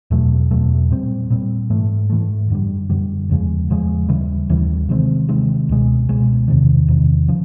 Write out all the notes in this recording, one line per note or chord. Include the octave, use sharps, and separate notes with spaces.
E2 B2 F#3 A3
E2 B2 F#3 A3
A#2 G3 C4
A#2 G3 C4
G#2 E3 A3
G#2 E3 A3
F#2 D3 G3
F#2 D3 G3
E2 C#3 F3 G#3
E2 C#3 F3 G#3
D#2 C#3 E3 G3
D#2 C#3 E3 G3
C3 D#3 G#3 C4
C3 D#3 G#3 C4
C#2 B2 G#3
C#2 B2 G#3
E2 C3 D#3
E2 C3 D#3
C#3 F3